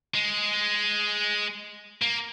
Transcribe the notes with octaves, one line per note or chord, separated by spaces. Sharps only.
G#3
A#3